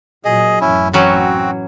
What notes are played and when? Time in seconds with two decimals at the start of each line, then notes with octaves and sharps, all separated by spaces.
0.25 A#2 F#3 G#4 D#5
0.61 A1 F#2 C#4 E4
0.93 E3 F#3 C4 C#4 F#4